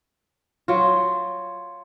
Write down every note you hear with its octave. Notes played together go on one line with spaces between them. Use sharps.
F#3 F4